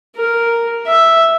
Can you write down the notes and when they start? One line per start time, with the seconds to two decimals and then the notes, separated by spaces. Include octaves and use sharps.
0.16 A#4
0.86 E5